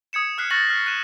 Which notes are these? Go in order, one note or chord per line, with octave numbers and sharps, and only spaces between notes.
D#6 G#6 C#7 E7
D#6 F6 F#6 B6 C7
C#6 F6 A6 A#6 C#7 F#7
F6
F#6 D#7 E7